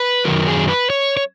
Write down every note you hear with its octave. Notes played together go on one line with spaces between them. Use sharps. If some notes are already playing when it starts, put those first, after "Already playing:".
Already playing: B4
F#2 D#3 F#3 A#4
G#4
B4
C#5
C#5